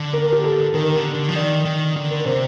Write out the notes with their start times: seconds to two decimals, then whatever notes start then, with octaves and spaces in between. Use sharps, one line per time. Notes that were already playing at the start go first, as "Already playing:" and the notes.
Already playing: D3
0.13 A#4
0.32 G4
0.44 A4
0.74 D#3 A#4
0.95 D3
1.15 D3
1.29 F3
1.35 D#3 D5
1.65 D#3
1.96 D3
2.11 A#4
2.26 C3 C5